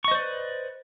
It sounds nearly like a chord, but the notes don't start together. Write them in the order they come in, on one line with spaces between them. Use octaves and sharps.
C#6 D#5 C5 D5 B4